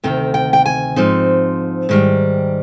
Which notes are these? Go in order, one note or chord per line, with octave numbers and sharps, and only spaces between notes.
D2 C3 D#3 G5
G5
G5
G#5
G#2 F3 C4 D#4
G#2 D#3 G3